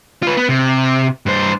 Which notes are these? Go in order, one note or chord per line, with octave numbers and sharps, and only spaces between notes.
F4 B4
B3
C3
G2 C5